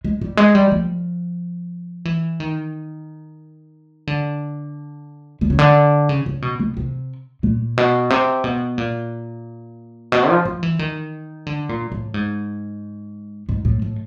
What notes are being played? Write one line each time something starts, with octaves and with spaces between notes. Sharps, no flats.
G#3
G3
G#3
G3
F3
E3
D#3
D3
D3
C#3
D3
C#3
C#3
B2
C3
C3
A#2
B2
C3
B2
A#2
B2
F3
F3
E3
D#3
D3
A#2
A2
G#2
G#2
A2
A2